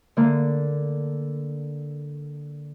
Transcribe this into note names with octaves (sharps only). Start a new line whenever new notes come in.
D3 A#3